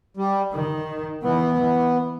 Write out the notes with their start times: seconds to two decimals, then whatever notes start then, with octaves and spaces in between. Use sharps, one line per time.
0.17 G3
0.53 D#3
1.23 E3 B3
1.59 E3